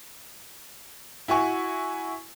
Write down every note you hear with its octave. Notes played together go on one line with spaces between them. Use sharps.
E4 F#4 G#5 C#6